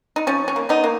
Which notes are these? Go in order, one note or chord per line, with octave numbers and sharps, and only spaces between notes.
D#4
F3 C#4
C#4
A#3
B3 D#4
A#3